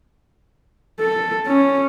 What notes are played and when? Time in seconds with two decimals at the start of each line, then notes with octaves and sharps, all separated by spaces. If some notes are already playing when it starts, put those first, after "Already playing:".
1.00 A4
1.48 C#4